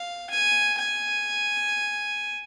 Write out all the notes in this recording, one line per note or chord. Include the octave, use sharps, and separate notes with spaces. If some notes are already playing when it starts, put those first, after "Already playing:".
Already playing: F5
G#5
G#5